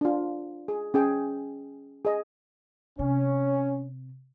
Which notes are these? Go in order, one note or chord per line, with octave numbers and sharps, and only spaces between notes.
D4 F4
G#4
C#4 G#4 G5
G#4 D#5
C3 C#4